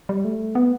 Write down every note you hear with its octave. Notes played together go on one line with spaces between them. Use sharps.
G3
A3
B3